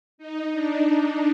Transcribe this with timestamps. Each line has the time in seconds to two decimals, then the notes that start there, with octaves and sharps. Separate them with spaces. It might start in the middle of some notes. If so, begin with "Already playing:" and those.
0.18 D#4
0.52 D4